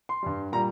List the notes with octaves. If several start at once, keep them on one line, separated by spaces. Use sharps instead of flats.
C6
G2 G3
A#2 G3 A#5